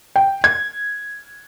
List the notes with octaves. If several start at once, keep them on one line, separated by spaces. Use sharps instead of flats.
G5
G#6